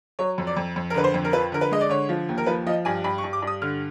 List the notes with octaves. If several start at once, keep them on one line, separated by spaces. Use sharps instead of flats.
F#3 C#5
F2
D5
F2
F2
A#4
D3 B4
C5
F2
A#4
F3 B4
D3 A#4
B4
G#3 D#5
D5
D3 C#5
F3
D#2
A#4
F3 B4
F3 D#5
G2 G#5
G2 B5
C#6
G2
D6
G2
D#6
D3 F6